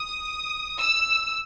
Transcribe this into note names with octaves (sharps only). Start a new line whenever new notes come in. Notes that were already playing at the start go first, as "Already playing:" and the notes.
Already playing: D#6
E6